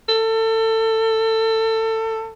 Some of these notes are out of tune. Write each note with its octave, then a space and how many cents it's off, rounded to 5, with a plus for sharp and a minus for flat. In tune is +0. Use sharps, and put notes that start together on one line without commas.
A4 +25